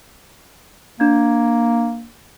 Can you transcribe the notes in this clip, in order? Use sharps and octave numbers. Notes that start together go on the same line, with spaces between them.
A#3 D4 G#6